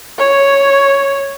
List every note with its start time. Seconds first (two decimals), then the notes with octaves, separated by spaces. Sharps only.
0.19 C#5